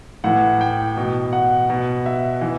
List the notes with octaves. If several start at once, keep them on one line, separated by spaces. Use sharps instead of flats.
A2 E3 F#5
G5
B2
F#5
B2
E5
E3